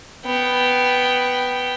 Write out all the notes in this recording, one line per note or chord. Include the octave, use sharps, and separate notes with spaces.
B3 G5